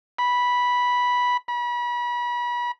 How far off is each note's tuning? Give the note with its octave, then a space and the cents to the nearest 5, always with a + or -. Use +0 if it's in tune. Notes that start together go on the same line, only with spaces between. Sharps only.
B5 -10
B5 -35